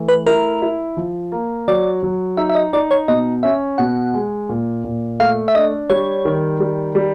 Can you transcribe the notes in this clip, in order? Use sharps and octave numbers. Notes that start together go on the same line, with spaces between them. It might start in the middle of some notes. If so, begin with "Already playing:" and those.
Already playing: E3 A3
B4
E4 A#4
E4
F3
A#3
F#3 D5
F#3
D#4 E5
E5
D#5
D#4 D5
C#5
B2 D#5
C#4 E5
B2 F#5
G#3
A#2
A#2
A3 F5
E5
D4 D#5
G3 C#5
D#3
G3
G3